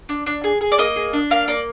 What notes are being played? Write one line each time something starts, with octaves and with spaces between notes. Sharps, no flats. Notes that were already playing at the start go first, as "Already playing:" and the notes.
D4
D4
G#4
G#4
D5
A#3 D#5
G#4
D4
A#3 F5
A#3 D5